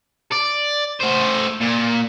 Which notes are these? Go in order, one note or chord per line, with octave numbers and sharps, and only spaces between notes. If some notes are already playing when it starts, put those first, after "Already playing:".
D5
A3 C5
A#2